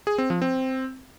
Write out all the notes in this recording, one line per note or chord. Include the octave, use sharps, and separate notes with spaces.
G#4
C4
F3
C4